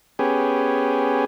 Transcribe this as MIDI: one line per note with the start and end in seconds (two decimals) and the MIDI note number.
0.19 1.25 59
0.19 1.25 61
0.19 1.25 67
0.19 1.25 68